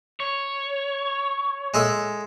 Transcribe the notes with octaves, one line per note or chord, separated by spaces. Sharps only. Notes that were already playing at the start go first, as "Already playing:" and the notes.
C#5
G#3 A4 E5